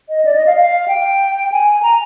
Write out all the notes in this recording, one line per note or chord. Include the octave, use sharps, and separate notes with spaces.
D#5
D5
D#5
F5
F5
G5
G#5
A#5